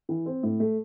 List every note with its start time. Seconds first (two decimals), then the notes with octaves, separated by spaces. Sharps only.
0.09 E3
0.26 C4
0.43 A2
0.60 A3